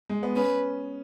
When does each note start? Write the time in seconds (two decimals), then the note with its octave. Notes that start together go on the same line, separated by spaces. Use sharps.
0.09 G#3
0.23 B3
0.36 C#4 B4